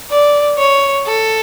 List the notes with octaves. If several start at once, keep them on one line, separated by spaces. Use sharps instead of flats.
D5
C#5
A4